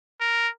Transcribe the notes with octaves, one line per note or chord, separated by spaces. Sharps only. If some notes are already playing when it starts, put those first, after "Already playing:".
A#4